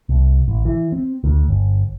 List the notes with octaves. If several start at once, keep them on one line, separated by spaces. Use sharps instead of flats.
C2
A1
E3
C4
D2
G1